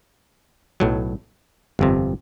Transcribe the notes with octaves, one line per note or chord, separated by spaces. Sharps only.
B1 A2 F#3
G1 F2 C3